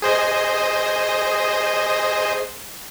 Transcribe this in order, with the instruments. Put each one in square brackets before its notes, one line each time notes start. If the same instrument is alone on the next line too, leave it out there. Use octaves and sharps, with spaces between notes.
[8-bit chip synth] G#4 C5 D#5